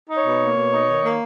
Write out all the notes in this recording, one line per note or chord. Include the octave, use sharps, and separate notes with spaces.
D#4
C#5
B2
A#3
B2
D#4
D#3
A#3